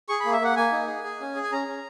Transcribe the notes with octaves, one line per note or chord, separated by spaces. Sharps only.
G#4 C#6
A#3 B5
E5
A#3 F#5
A#3 G#5
D#4
G#4
G#4
C#4
G#4
G#5
C#4 A#5
C#4